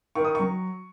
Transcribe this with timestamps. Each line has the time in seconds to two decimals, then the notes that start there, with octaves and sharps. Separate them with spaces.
0.15 D#3 C#6
0.24 D#6
0.35 F#3 C#6